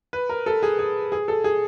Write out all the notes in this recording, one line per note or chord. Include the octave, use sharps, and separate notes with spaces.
B4
A#4
A4
G#4
G#4
G#4
A4
G#4